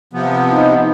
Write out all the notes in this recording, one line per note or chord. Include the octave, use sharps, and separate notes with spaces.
C3 F3 B3
D#4